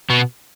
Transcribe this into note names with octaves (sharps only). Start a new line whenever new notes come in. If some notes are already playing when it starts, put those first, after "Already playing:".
B2 B3